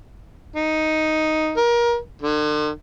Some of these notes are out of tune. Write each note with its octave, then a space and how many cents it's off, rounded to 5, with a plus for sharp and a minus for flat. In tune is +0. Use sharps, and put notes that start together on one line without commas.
D#4 +5
A#4 +25
D3 +45